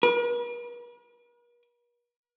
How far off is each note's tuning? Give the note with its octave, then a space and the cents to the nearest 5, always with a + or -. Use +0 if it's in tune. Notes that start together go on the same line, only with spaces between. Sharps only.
B4 -45